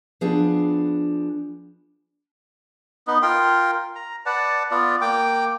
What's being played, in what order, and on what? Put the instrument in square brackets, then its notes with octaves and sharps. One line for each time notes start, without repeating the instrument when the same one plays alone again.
[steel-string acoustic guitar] F3 B3 D4 G#4
[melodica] B3 D#4
F4 A#4 G5 C6
A#5
B4 D5 F#5 A5
B3 F4 D5
A#3 G5 D6